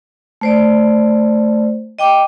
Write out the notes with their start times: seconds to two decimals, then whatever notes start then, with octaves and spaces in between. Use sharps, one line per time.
0.41 A3 C5 D5
1.99 D#5 G5 D6